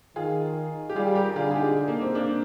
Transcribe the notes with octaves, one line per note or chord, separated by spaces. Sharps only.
D#3 F4 G#4
G4
G3 F4 G#4
G4 A#4
D3 F4 G#4
G#4
D#4 G4
A#3
C4
A#3 D4